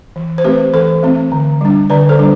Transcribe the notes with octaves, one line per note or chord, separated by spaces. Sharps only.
E3
C5
A3 C4 G4 B4
E3 A4 C5
A3 C4
D3
G3 D4
D3 B4 D5
A4 C5
G3 D4